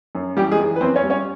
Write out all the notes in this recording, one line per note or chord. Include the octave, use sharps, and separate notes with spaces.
F#2
E3 G3 G4
G#3 G#4
E3
B4
F#2 C4 C5
C#4 C#5
G3
C#4 C#5